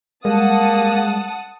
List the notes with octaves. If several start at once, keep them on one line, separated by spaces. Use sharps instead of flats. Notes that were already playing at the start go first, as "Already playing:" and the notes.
G3 G#3 A#3 F#5 A5 D#6